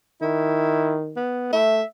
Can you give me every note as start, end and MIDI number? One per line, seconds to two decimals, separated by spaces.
0.22 1.18 51
0.22 0.96 64
1.16 1.51 59
1.53 1.81 57
1.53 1.84 76